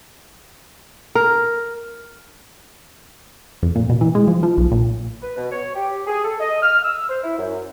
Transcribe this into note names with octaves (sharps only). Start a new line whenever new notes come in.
A#4
F2
A#2
B2
E3
G#3
F3
F3
B1
A#2
B4
B2
C#5
G4
G#4
A4
D#5
F6
E6
C5
E4
F#2